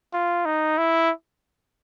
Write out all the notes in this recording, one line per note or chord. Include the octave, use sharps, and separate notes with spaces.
F4
D#4
E4